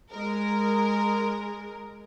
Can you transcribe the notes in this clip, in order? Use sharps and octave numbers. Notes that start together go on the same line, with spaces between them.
G#3 A#4